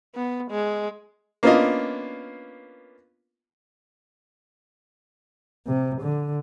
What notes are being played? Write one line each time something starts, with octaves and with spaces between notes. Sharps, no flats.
B3
G#3
A#3 B3 C#4 D4 F4 D#5
C3
D3